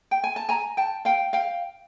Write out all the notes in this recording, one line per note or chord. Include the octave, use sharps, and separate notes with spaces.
G5
G#5
A5
G#5 A#5
G5 A5
F5 G5
F5 G5